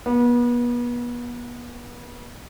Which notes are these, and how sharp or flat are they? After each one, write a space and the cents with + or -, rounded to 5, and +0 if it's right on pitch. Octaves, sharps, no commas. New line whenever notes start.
B3 -35